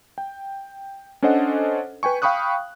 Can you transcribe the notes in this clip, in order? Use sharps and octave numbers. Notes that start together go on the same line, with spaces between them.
G5
C#4 D4 A4 C5 D#5 F#5
B4 G5 G#5 C#6
F5 G5 B5 C#6 D#6 F#6